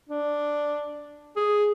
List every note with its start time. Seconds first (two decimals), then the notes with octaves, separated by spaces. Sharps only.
0.09 D4
1.36 G#4